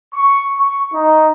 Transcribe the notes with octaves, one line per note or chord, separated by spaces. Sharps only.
C#6
C#6
D#4